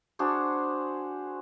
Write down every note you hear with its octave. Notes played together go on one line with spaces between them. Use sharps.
D4 F#4 G#4 C5